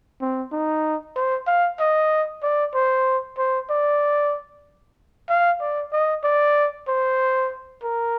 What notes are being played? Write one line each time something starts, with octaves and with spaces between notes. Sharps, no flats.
C4
D#4
C5
F5
D#5
D5
C5
C5
D5
F5
D5
D#5
D5
C5
A#4